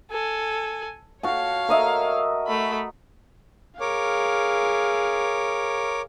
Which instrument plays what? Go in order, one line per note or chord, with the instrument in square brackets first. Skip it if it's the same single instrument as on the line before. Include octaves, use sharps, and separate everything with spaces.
[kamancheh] A4 G#5
[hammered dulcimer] F#4 A5 [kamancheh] C#5 F5
[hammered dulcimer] A#4 D#5 E5
[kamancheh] A3 B5
[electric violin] G#4 F5 [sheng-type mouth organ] A#4 C#5 D6